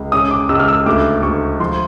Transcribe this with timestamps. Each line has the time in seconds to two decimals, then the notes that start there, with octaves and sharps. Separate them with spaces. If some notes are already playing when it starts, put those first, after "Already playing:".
Already playing: C#2
0.12 C#4 D#6
0.31 D6
0.49 C#2 E6
0.59 F6
0.68 E6
0.86 D2 D6
1.23 D2 C#6
1.60 F3 C6